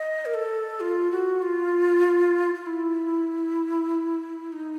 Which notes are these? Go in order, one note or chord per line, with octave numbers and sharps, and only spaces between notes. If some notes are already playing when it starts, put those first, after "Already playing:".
Already playing: D#5
A#4
A4
F4
F#4
F4
F4
E4
D#4